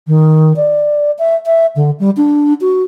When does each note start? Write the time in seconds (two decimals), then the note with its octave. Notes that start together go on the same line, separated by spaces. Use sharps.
0.08 D#3
0.56 D5
1.19 E5
1.46 E5
1.76 D3
2.00 G3
2.17 D4
2.61 F#4